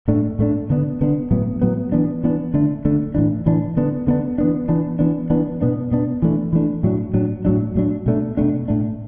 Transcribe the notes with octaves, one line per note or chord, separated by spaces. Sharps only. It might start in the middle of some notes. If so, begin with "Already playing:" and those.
A2 A3 D4
A2 A3 D4
D3 B3 D4
D3 B3 D4
A2 F#3 B3
A2 F#3 B3
E3 B3 D4
E3 B3 D4
D3 A3 D4
D3 A3 D4
A2 E3 D4
A2 E3 D4
D3 B3 D4
D3 B3 D4
E3 B3 D4
E3 B3 D4
E3 B3 D4
E3 B3 D4
B2 B3 D4
B2 B3 D4
E3 A3 D4
E3 A3 D4
A2 F#3 D4
A2 F#3 D4
A2 F#3 D4
A2 F#3 D4
B2 A3 D4
B2 A3 D4
A2 A3 D4